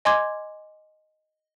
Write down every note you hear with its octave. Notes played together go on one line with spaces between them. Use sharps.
D#5 G#5 C6 D6 G#6